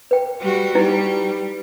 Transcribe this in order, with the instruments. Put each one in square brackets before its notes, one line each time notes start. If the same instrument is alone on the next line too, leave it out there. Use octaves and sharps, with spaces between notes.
[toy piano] B4 G5
[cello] G3 F#4
[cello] G3 [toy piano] D#4 E4 B4